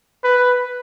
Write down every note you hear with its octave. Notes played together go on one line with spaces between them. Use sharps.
B4